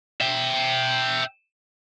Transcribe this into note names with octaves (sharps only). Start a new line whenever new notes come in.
E5 G5